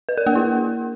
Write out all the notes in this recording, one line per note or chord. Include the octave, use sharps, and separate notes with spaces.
B4
A#4
A#3
E4